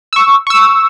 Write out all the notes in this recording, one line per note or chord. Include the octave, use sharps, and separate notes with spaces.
C#6 E6
C#6 E6